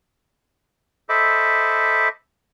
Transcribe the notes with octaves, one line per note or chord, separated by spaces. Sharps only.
A4 C5 D#5 E5 B5 D6